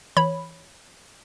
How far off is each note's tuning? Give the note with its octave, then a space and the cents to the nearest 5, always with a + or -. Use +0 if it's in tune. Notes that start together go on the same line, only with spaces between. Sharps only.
E3 +0 C#5 +0 B5 +0